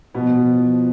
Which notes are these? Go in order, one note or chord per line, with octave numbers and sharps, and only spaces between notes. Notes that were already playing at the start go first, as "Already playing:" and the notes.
B2 F3 B3
F3
F3